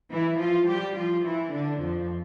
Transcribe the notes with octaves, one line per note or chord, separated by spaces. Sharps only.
E3 E4
F3 F4
G3 G4
F3 F4
E3 E4
D3 D4
F2 F3